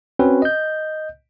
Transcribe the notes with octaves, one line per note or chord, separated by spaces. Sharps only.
C4 C#4 F#4 B4
D#5 G6